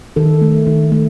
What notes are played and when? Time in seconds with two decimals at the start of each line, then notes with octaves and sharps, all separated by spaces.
0.16 D#3 A4
0.42 A3
0.67 D#3
0.92 A3